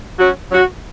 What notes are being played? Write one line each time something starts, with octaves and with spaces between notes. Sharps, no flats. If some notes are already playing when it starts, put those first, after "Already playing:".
F#3 C#4 F#4
F#3 C#4 F#4